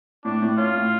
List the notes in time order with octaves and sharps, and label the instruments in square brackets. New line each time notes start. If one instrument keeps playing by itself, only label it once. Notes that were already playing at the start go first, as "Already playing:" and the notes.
[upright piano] A2 [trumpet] D4
[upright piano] A2
[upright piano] C#4 [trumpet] F4
[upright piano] A2